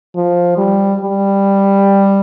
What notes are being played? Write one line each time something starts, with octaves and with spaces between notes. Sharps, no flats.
F3
G3
G3